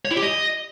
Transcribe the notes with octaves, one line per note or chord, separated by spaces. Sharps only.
C#5
E4
G4
D#5